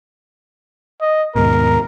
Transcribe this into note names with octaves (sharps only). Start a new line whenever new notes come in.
D#5
D#2 G#2 B2 A#4